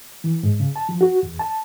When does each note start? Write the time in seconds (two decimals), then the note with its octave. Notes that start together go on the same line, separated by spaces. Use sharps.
0.24 E3
0.43 G#2
0.60 C#3
0.76 A5
0.89 F3
1.01 F#4
1.23 E2
1.39 A5